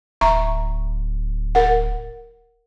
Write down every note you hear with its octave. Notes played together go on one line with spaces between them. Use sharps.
D1 E5 A#5 C#6
A#4 F#5